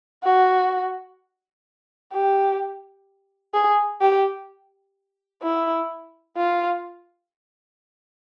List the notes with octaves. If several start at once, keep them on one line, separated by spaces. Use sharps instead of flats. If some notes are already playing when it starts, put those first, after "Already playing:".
F#4
G4
G#4
G4
E4
F4